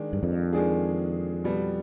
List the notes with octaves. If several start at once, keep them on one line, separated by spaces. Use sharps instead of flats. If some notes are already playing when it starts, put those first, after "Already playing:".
Already playing: D#3 G#3 D4
G2
F2
D#3 G#3 D4 G#4
B2 G3 B3